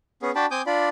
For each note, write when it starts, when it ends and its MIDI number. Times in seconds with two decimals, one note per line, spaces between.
0.22 0.31 59
0.22 0.31 61
0.22 0.31 68
0.35 0.46 62
0.35 0.46 66
0.35 0.46 79
0.35 0.46 81
0.35 0.46 83
0.51 0.62 60
0.51 0.62 80
0.51 0.62 86
0.51 0.62 87
0.51 0.62 91
0.66 0.89 62
0.66 0.89 65
0.66 0.89 74
0.66 0.89 83